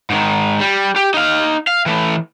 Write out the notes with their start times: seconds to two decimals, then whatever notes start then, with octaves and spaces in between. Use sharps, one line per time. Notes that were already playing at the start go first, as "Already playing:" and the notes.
0.10 G#2 D#3
0.60 G3
0.96 G4
1.14 D#4 F5
1.67 F5
1.86 E3 A3